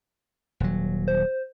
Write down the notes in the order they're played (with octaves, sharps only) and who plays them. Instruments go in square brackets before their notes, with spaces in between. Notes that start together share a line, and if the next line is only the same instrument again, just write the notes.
[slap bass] D#1 F#3
[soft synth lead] C5